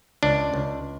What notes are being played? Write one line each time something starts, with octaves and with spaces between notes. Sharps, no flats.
C#2 D4
C#2